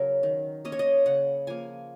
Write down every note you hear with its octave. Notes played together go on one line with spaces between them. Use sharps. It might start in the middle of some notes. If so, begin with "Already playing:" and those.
Already playing: C#3 F#3 C#4 A#4
D#3
A#3 C#4 D#5
C#5
D#5
C#3 F#5
F3 A#3 G#5